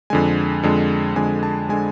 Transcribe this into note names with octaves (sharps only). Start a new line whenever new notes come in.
F2 D3 G#3 G#5
F2 D3 G#3
F2 D3 G#3 G#5
A5
D3 G#3 G#5